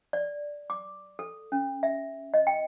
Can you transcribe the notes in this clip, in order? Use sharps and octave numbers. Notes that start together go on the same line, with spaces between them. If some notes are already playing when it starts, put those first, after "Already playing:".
D5
D6
A4
C#4
E5
D#5
G5